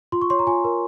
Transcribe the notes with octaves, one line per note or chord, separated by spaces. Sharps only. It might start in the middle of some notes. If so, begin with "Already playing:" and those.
F4 C6
C#6
C#5 C6
A#5
F4 G#5
A#4